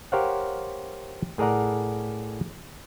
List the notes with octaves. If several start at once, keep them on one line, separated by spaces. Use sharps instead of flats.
G4 A#4 C5 C#5 F5 F#5
A2 G#4 A#4 D5 F#5 A#5